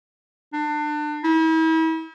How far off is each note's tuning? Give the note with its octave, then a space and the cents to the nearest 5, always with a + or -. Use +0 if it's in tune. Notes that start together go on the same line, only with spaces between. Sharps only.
D4 +30
E4 -40